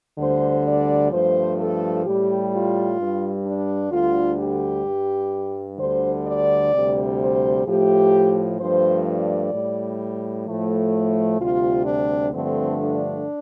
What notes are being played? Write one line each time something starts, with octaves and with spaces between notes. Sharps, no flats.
D2 D3 G3 C5
D5
G2 F3 A3 C5
A4
A2 G3 G4
F4
G2 G3
D4
D2 D3 G3 F4
G4
G2 G3
D2 D3 G3 C5
D5
D2 C3 G3
C5
A2 F3 A3 G4
G2 F3 A3 C5
D5
A2 G3
A2 F3 A3
A4
D2 C3 G3 F4
D4
G2 D3 F3 A3 C4
D4